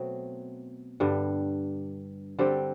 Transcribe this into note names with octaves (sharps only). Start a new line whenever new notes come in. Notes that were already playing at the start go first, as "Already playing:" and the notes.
Already playing: B2 F#3 A3 C4
G2 D3 G3
D3 G3 C4 G4